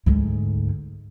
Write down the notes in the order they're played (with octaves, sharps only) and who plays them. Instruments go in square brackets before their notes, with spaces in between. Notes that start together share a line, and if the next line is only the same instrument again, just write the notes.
[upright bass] D2 G#2